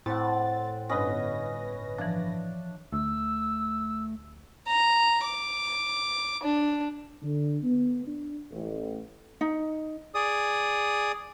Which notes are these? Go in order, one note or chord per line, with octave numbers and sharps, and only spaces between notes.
A2 C4 F#5 A6
G1 C#4 B4 D#5 A#6
E3 F3 D4
D2 A3 E6
A#5
D6
D4
D3
B3
D4
A1
D#4
G#4 D5 D#6